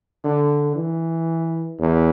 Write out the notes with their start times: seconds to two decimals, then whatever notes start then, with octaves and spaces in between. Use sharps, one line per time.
0.24 D3
0.76 E3
1.79 E2